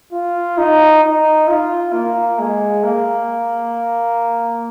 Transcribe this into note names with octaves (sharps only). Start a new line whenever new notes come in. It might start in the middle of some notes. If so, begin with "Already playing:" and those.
F4
D#4
D#4
F4
A#3
G#3
A#3